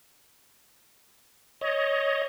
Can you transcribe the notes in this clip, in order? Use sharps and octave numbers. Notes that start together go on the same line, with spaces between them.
C#5 D#5